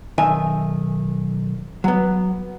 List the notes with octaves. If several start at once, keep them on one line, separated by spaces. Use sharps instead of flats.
B1 D#3 E5 G#5
F#3 B3